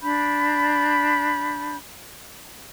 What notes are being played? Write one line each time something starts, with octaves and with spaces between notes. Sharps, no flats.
D4 B5 G6